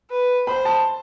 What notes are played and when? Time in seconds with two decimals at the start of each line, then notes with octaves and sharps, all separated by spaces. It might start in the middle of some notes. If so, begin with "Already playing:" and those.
0.10 B4
0.47 C5 B5
0.65 A5